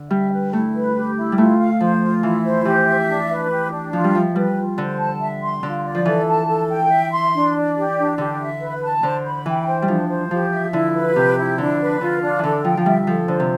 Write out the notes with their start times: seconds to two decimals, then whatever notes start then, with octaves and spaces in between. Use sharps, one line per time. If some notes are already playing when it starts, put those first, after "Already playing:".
Already playing: D3
0.10 G3 E5
0.32 B4
0.53 A3 E4
0.74 B4
0.96 G4
1.16 E4
1.32 G3
1.37 A3 F4
1.59 F5
1.80 F3 C5
2.02 F4
2.23 E3 E4
2.45 C5
2.65 E3 G4
2.87 E5
3.07 D4
3.30 B4
3.50 G4
3.72 D4
3.93 F3 F4
4.04 G3
4.14 F3 E5
4.35 G3 B4
4.57 F4
4.78 D3 C5
4.99 A5
5.21 E5
5.42 C6
5.63 D3 F4
5.84 D5
5.95 F3
6.05 E3 A4
6.27 A5
6.48 A4
6.69 G5
6.90 E5
7.12 C6
7.33 D4
7.55 D5
7.76 G4
7.97 D4
8.18 D3 G4
8.40 E5
8.61 B4
8.82 A5
9.03 D3 C5
9.25 B5
9.46 E3 G5
9.66 C5
9.82 G3
9.88 F3 D4
10.09 C5
10.31 F3 G4
10.51 E5
10.73 D3 E4
10.95 B4
11.15 C3 G4
11.37 E4
11.58 D3 D4
11.80 B4
12.01 D3 F4
12.22 D4
12.39 D3 E3 A4
12.64 F3 G5
12.77 F3
12.86 G3 E5
13.07 F3 A4
13.28 D3 C5
13.40 C3